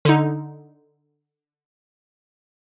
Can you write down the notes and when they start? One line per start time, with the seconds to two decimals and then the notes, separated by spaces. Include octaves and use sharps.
0.05 D3 D#4